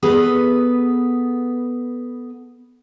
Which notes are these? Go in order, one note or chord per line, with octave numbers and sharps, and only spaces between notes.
B3 G#4 A4 B4